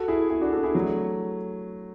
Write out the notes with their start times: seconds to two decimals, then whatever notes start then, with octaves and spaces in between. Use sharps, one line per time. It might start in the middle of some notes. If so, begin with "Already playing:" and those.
Already playing: F#4 A4
0.08 E4 G#4
0.30 E4 G#4
0.41 D4 F#4
0.53 F#4 A4
0.63 E4 G#4
0.74 F#3 A3